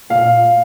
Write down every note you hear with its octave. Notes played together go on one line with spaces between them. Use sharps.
A#2 F5